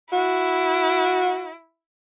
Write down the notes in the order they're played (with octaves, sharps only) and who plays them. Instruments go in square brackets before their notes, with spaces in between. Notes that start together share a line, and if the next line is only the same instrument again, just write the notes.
[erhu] E4 [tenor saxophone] F#4